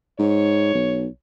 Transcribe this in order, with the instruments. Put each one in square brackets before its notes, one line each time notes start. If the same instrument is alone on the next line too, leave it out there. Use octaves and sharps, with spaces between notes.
[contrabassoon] G#2 [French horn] C#5
[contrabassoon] B1